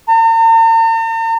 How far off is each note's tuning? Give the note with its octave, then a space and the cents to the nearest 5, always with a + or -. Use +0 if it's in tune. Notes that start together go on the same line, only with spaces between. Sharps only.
A#5 -45